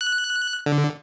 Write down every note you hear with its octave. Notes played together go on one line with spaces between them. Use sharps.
F#6
D3